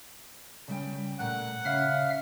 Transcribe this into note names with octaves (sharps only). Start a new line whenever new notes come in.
C#3 G3 G5
A#2 A3 F#5
C#3 E5 F5 F6